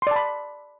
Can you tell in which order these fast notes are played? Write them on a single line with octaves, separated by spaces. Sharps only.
C6 D5 A5 B5